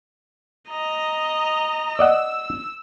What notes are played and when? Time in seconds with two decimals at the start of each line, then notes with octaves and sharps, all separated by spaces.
0.70 D#5 A#5
1.99 D5 D#5 F#5 E6